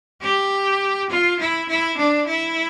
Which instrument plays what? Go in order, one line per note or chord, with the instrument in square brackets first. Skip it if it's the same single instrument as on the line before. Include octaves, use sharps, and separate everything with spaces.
[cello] G4
F4
E4
E4
D4
E4